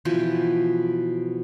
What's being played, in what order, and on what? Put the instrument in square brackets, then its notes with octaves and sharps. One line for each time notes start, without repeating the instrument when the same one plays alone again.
[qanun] B2 E3 F3 G5